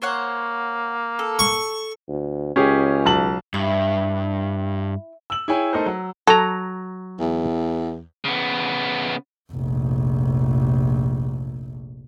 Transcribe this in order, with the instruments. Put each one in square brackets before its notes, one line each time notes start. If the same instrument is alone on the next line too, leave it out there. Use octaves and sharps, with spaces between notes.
[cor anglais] A#3 [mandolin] C5 C#5 F#5
[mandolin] A4
[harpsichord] C#6
[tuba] D2
[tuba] C#2 [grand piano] C#4 G4 G#4
[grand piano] B1 A5 F#7
[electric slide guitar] G2 [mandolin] E4
[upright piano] E6 F#7
E4 G#4 C#5 G5 G#5
A3 D#4 A4 A#4 C5
F#3
[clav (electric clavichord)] F#3 A#5 [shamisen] A4
[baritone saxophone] E2
[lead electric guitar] C#3 B3
[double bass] F1 A#1